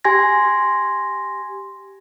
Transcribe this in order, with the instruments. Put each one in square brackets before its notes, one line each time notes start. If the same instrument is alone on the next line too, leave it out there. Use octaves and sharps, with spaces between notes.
[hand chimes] G4 G#5 C6 G#6 A#6